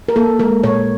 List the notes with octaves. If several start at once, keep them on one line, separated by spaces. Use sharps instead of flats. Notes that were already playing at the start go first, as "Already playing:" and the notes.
A#4
A#3 A4
G#3 A#4
A#2 C#5